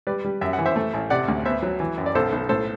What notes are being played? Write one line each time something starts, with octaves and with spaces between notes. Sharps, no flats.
G3 B4 D5
G3
F#2 E5
F#5
E3
C5 E5
A3
A1
C3 D5 F#5
D2
B3 C5 E5
F#3
E3
F#2
D5
B1 A4 C5
B1
A2 A4 C5